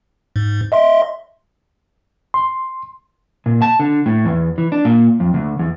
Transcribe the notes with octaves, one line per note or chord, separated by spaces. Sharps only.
G#2
D#5 E5 C6
C6
A#2
A5
D3
A2
E2
E3
D4
A#2
F2
D2
E2